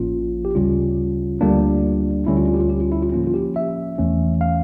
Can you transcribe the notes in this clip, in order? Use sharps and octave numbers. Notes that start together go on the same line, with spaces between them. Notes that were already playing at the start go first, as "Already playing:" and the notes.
Already playing: A1 A2 F3 A#3 C#4 F4
G4
D2 C#3 G3 C#4 F4
D2 D3 G3 A#3 D4
D2 D3 G3 C#4 E4
F4
F4
G4
F4
G4
F4
E4
F4
A2 F3 A#3 C#4 F4
F4
G4
E5
E2 E3 A3 C#4
F5